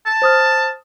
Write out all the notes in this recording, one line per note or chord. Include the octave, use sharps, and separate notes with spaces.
A5
C5 D#6 F6